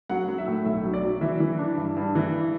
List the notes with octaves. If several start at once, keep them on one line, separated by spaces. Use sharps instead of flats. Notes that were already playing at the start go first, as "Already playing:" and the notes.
F#3 F#5
F#3
E5
A2
B1 E5
F#3
D5
F#3
E3 E5
E3
D4
G2
G2
E3